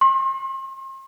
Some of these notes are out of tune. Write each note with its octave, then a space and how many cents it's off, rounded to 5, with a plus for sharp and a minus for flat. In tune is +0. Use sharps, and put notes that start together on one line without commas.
C6 +40